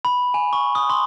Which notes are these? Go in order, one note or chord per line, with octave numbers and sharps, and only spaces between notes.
B5
G#5
C#6
D#6
C6